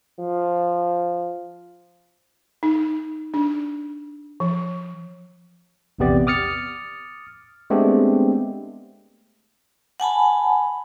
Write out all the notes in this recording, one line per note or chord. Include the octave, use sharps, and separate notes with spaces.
F3
D#4
D4
F3
A#1 E2 C3 B3 G4 D5
D6 D#6 F6 A6 C#7
G#3 A3 B3 C4 D4 G4
F#5 G#5 A5 B5